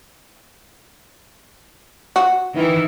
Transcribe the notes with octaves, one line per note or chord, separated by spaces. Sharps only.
F#4
D#3 E3 E4